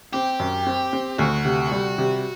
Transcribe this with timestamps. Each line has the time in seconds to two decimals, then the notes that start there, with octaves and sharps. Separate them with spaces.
0.13 C4 G4
0.39 F#2
0.67 C4
0.93 C4
1.19 D2 F#4
1.45 C3
1.72 G3
1.98 C3